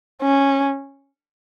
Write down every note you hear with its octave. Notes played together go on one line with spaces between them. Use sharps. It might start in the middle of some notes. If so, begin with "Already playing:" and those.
C#4